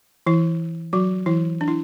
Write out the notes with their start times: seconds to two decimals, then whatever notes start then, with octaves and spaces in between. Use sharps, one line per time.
0.26 E3 E4
0.93 F#3 F#4
1.26 E3 E4
1.61 D4
1.68 E4